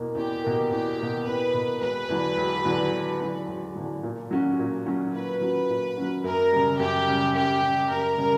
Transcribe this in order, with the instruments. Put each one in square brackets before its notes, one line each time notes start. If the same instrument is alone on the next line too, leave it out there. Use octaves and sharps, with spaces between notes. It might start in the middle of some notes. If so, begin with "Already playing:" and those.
Already playing: [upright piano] E2 B2 A#3
[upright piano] E2 [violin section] G4
[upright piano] B2 A#3
[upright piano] E2 [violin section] G4
[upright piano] B2 A#3
[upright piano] E2 [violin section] B4
[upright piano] B2 A#3
[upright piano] E1 [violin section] B4
[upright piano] E2 D3 F#3
E1
E2 D3 F#3
E1
E2 D3 F#3
E1
E2 D3 F#3
A#2
F#3 C#4 F#4
A#2
F#3 C#4 F#4
[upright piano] A#2 [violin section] B4
[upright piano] F#3 C#4 F#4
A#2
F#3 C#4 F#4
[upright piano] F#2 [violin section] A#4
[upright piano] C#3 G3
[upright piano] F#2 [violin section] G4
[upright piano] C#3 G3
[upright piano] F#2 [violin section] G4
[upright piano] C#3 G3
[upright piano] F#2 [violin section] A#4
[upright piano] C#3 G3